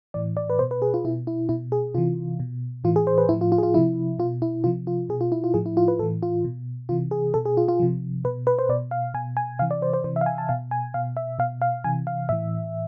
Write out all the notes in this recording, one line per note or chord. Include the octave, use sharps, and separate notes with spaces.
A2 E3 D5
D5
B4
B2 C5
B4
G#4
F4
B2 E4
E4
B2 E4
G#4
C3 E3 F4
B2
A2 E3 F4
G#4
C5
B4
A2 F3 E4
F4
F4
G#4
F4
C3 F3 E4
B2 F4
E4
C3 F3 F4
F4
B2 G#4
F4
E4
F4
A2 F3 G#4
E4
F4
B4
A2 E3 A4
F4
B2
C3 E3 F4
G#4
B2 A4
G#4
F4
F4
C3 F3
B2 B4
B4
C5
B2 D5
F5
B2 G#5
G#5
C3 E3 F5
D5
C5
C5
C3 E3 C5
E5
F5
G#5
A5
B2 F5
G#5
B2 F5
E5
B2 F5
F5
C3 E3 G#5
F5
A2 E3 E5